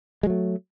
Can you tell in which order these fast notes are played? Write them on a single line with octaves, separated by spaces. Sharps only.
G#3 F#3 A3